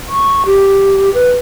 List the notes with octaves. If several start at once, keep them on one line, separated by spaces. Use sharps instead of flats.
C#6
G4
B4